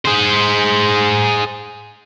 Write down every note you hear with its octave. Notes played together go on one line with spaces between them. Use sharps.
G#4 C5